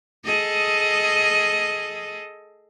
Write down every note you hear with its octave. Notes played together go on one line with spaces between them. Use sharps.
G#4 A4 D#5